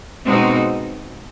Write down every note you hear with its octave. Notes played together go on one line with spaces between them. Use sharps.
B2 G#3 C4 D#4 F#4